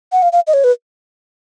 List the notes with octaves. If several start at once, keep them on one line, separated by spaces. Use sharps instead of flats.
F#5
F5
F5
D#5
C#5
B4